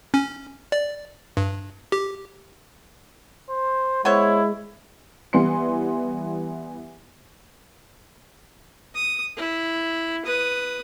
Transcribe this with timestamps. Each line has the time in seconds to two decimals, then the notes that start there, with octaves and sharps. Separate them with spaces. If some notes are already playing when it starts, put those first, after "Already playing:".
0.14 C#4
0.72 D5
1.37 G2
1.92 G4
3.49 C5
4.05 G#3 B3 E4 C5 C#5
5.33 E3 G3 B3 C6 C#7
8.95 D#6
9.37 E4
10.25 B4 D#6